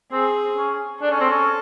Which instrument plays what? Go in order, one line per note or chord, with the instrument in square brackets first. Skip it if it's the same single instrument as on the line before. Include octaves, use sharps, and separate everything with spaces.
[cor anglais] C4 [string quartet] G#4
[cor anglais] C#4
[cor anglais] D4 [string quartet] A4
[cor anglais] C#4
C4
C#4